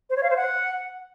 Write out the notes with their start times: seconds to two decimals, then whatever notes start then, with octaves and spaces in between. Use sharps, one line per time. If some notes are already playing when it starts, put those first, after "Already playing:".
0.09 C5
0.16 C#5
0.23 F5
0.30 C5
0.36 F#5